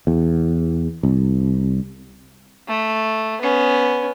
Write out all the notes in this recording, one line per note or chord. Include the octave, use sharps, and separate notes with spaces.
E2
C2
A3
B3 C#4